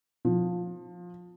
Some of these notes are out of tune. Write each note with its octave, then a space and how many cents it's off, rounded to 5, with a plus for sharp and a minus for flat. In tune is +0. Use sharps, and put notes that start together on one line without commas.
F3 +20